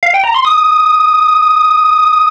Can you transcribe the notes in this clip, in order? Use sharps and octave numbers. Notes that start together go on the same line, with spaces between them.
F5
G5
A#5
C6
D#6